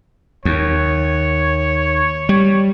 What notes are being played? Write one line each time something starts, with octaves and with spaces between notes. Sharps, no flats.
D#2 C#5
G3